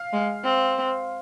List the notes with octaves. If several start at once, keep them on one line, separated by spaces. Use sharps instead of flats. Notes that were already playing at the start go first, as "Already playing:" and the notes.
Already playing: F5
G#3
C4